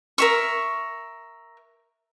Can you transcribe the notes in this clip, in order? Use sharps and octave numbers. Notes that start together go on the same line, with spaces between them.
A#4 E5 C#6